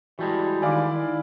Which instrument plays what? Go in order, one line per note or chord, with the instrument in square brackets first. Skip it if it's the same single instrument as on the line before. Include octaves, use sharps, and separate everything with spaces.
[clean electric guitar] E3 G3 G#3 [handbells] F#4 A5
[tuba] D#3 [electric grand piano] E4 D5 F5 [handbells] G#5 D6